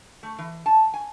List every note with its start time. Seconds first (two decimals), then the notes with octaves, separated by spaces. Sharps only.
0.23 A3
0.39 E3
0.66 A5
0.94 G#5